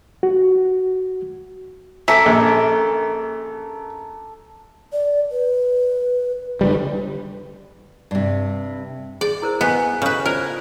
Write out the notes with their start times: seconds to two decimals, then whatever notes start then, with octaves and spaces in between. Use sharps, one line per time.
0.23 F#4
2.08 C#4 A4 E5 A#5 D6
2.26 A#1
4.93 D5
5.31 B4
6.61 D3 D#3 G3 B4
8.11 G2 C3
9.21 G#4 D5
9.42 E4 A#4 C5
9.61 B3 F#5 G#5 C#6
10.02 C#3 A4 B4 C#5
10.26 F4 A#4 C5 D5